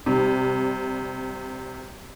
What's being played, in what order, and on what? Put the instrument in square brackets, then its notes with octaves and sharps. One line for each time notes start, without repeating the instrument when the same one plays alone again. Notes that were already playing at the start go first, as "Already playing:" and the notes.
[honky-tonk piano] C3 G3